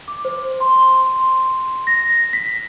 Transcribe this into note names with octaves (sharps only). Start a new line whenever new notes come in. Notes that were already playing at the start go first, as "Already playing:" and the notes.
D6
C5
C6
C6
A#6
B6